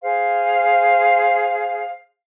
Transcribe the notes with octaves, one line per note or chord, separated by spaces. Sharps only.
G#4 C5 F5